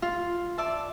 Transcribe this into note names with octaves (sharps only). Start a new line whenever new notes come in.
F4
D5 E5 A5